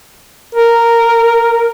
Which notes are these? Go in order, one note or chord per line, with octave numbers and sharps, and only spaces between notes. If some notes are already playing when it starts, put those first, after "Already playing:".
A#4